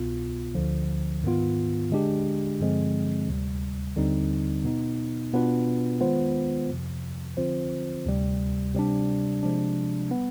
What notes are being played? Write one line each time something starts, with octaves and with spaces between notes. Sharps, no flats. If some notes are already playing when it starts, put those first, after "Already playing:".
Already playing: C2 B2 B3 F4
D2 D3 F3
G#2 D#3 B3 F4
D3 G#3 D4 G4
G2 D3 F3 G#3 C4
D2 C3 G3
D#2 D3 G3 C4 D#4
B2 B3 D#4
B2 B3 D4 F4 B4
D#3 G#3 B3 F4 C5
F2 C3 F3
D3 F3 C4 F4 C5
D2 C3 G3
C3 G3 D4
C3 F3 G#3 D4
G3 B3